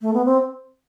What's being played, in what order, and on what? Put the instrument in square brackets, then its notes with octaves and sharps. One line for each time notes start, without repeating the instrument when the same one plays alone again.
[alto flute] A3
B3
C4